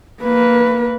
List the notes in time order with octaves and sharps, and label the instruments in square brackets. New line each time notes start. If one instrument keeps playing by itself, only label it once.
[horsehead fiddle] A#3 B4